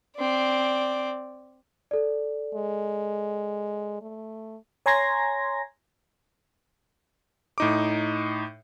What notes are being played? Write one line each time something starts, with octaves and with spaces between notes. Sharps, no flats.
C4 D5
A4 D5
G#3
A3
C#5 G#5 A#5 C6 G#6 A#6
A2 D#4 D6